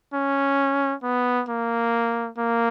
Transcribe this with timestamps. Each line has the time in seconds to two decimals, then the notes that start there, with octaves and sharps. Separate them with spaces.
0.14 C#4
1.03 B3
1.49 A#3
2.38 A#3